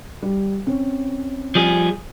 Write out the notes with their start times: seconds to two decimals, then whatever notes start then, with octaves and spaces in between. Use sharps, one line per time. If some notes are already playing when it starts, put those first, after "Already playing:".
0.23 G3
0.67 C4 C#4
1.55 F3 G3 G#4